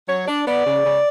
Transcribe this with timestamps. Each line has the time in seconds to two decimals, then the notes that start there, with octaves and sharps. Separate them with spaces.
0.08 F#3 C#5
0.28 D4 D5
0.46 B3 D5
0.66 C#3
0.84 C#3